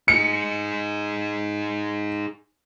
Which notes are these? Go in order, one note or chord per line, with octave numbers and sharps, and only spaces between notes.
D#4 G#4 C#7